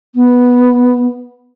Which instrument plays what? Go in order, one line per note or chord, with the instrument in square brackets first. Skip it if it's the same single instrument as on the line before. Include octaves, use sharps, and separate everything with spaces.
[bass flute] B3